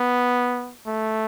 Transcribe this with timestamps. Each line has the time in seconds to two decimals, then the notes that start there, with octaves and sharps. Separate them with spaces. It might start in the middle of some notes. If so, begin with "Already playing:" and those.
Already playing: B3
0.87 A3